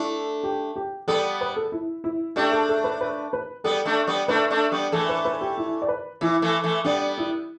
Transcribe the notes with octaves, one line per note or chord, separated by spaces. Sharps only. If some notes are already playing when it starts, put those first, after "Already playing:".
Already playing: A3 D4 E4
G4
G4
G3 B3 A4
B4
A4
E4
E4
A3 D4 G4
A4
A4
B4
B4
B4
G3 B3 A4
A3 D4
G3 B3
A3 D4 B4
A3 D4
G3 B3
E3 A3 A4
B4
B4
G4
E4
D5
B4
E3 E4
E3 A3
E3 A3
G3 B3 D4
E4